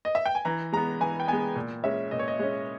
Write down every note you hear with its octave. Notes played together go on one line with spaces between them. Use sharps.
D#5
E5
G5
G#5
E3 A#5
G#3 B3 A#5
E3 G#5
G5
G#3 B3 G#5
A#2
G#3 C#4 E5
A#2 D#5
C#5
D#5
G#3 C#4